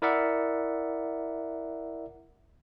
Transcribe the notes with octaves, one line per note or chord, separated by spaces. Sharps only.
E4 A#4 D5 E5 F#5